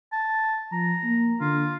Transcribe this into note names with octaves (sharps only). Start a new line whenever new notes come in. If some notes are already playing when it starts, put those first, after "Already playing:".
A5
F3 A#5
A#3
D3 F4